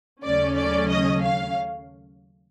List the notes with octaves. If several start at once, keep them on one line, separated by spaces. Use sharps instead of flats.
D#2 C#3 F#3 A3 C#4 D5
D5
D#5
F5